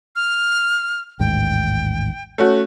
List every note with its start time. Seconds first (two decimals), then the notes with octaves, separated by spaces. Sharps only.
0.16 F6
1.19 A1 D#2 G#2 G5
2.38 A3 C#4 F#4